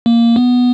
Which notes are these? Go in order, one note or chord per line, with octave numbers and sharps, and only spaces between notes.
A#3
B3